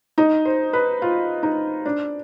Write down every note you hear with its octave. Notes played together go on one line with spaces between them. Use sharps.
D#4
C5
B4
F4
D#4
D4